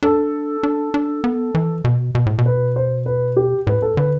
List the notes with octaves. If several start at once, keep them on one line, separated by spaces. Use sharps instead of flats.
D4 A4
D4
D4
B3
E3
B2
B2
A2
B2
B4
C5
B4
G4
A2 B4
A4
D3 B4